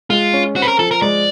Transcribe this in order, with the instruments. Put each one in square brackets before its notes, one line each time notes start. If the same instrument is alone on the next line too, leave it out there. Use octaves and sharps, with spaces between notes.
[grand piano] G#3 [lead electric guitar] F4
[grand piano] C#4
[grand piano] C4 [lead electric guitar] F#4
[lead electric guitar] B4
A#4
[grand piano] F3 [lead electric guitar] A4
[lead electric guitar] A#4
[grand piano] G#3 [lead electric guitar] D5